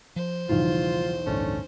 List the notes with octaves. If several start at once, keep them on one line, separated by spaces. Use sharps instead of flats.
F3 C5
B1 E2 C#3 F3 G3 F4
A1 D2 G2 A3 C#4 D4